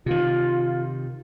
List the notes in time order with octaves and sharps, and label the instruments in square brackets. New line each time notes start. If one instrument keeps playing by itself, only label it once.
[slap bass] C3 D#3 [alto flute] F4